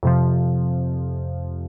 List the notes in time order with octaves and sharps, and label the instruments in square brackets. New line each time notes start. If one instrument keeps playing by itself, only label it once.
[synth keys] F2 C3 F3